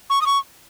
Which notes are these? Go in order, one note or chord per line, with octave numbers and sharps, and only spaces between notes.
C#6
D#6
C#6